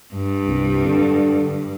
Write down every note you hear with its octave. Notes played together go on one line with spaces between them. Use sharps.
G2
C2
D3